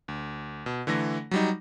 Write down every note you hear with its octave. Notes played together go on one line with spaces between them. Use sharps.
D2
B2
D3 E3 A3 A#6
F#3 G3 D#4